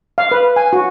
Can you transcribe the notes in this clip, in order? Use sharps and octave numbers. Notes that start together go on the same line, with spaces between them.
F5
B4
G#5
F#4